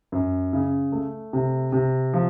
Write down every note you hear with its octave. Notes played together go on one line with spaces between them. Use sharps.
F#2
C#3
A3
C3
C3
F3